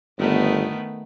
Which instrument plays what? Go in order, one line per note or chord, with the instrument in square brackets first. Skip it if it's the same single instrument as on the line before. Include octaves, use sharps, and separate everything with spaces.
[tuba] G1 [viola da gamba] D#3 A3 B3